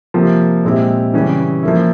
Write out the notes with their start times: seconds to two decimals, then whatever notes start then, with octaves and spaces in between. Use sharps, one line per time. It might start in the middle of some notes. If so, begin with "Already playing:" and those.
0.14 C3 F3 A#3 F4
0.64 A#2 G#3 C4 E4 G4
1.14 C#3 E3 G3 C#4 E4
1.63 F3 A#3 E4